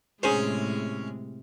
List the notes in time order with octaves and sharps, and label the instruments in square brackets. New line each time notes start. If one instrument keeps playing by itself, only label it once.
[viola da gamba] A2 C3 G#3 [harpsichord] C#4 [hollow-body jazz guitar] G#4 C5